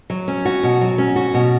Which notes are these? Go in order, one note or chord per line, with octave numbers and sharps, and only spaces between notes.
F#3
C#4
F#4
B2
F#3
C#4
F#4
B2